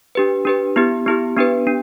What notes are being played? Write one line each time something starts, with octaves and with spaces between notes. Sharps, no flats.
D4 G4 B4
D4 G4 B4
B3 E4 G4
B3 E4 G4
B3 D4 G4 B4
D4